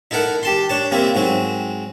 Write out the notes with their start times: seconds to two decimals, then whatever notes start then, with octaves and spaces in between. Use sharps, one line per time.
0.11 D#4 E4 A4 A#4 F#5
0.43 G4 A5 C6
0.69 D4 C#5 A5
0.91 C3 A#3 C4 E4
1.15 G#2 F#3 C4